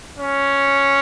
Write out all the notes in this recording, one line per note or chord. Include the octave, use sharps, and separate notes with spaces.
C#4